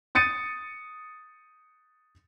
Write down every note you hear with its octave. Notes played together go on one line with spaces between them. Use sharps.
D#6 A6 C#7 D#7